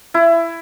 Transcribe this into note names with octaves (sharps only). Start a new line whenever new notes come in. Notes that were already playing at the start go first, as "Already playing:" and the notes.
E4